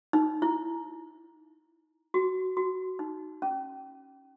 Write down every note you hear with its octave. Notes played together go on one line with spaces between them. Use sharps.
D#4
E4
F#4
F#4
D#4
C#4